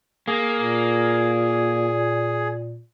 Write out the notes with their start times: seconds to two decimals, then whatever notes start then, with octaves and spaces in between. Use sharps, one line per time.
0.27 A#3 G#4
0.57 A#2